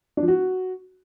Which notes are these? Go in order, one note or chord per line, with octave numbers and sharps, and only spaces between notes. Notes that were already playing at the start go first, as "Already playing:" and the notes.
D4
F3
F#4